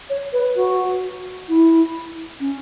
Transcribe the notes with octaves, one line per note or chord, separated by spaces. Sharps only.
C#5
B4
F#4
E4
C#4